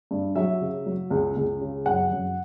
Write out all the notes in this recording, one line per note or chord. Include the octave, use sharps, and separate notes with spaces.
G2
F#3 E5
C#3
F#3
C#2
C#2
C#3
F#2 F#5
F#2